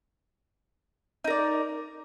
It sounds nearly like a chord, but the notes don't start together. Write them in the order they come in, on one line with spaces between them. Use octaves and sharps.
D#4 A#4 D5